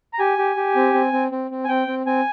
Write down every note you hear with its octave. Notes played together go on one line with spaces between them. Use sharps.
A#5
G4 G#5
G4
G4
C4
C4
C4
C4
C4
G#5
C4 G5
C4
C4 G#5